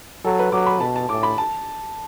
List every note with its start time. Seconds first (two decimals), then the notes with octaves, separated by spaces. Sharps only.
0.25 F#3 A4
0.39 B4
0.52 F#3 D6
0.66 B5
0.80 B2 A5
0.96 A5
1.09 A2 D6
1.23 B5
1.38 A5